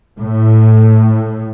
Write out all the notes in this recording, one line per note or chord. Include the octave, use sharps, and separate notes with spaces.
A2